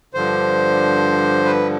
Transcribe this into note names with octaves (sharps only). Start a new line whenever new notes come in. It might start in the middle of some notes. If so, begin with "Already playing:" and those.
G2 D3 F3 C5
B4